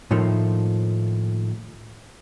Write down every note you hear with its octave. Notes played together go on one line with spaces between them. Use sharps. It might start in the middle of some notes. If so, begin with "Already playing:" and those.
A2 D#3 F3 A3 A#3